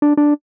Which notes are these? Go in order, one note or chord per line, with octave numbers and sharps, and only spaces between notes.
D4
D4